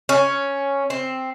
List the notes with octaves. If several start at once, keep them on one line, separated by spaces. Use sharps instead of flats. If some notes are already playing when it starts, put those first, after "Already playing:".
C#4
C4